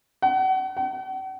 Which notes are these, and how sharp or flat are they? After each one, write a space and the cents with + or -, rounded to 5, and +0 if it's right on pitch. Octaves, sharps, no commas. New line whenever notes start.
F#5 +35
F#5 +45